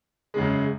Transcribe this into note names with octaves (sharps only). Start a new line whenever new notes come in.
F#2 C#3 G#3